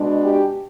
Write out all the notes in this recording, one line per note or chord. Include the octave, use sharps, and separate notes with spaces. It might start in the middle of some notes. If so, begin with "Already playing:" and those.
Already playing: B2 G#3 D4
G4